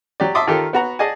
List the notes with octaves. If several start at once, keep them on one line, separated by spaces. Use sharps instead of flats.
F#3 G4 D5
E5 A5 C6 D6 D#6
D#3 F4 G4 A4 A#4
B3 F#4 A#5
G#4 D5 D#5 F#5 G#5 A5